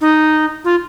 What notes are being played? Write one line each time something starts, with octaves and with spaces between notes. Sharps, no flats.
D#4
F4